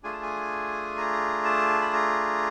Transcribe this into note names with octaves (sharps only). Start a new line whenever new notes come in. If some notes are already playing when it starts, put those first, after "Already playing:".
A3 D4 F4 G#4 G#5
A5
G#5
A#5
A5
B5
A#5